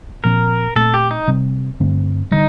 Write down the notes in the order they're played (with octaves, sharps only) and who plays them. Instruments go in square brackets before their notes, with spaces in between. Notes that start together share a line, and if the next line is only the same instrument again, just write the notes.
[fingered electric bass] A#2 F3 C4 [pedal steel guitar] A#4
[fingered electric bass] A#2 A3 C4 [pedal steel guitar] A4
[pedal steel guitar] G4
D#4
[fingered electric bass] C3 G3 C4
G2 D3 A3 C4
[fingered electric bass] D3 G3 [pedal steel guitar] D#4